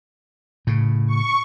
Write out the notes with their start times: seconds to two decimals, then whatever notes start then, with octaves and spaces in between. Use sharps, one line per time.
0.67 A2 C#3
1.07 C#6